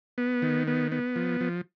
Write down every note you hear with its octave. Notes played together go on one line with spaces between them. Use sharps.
B3
D#3
B3
B3
F3
F3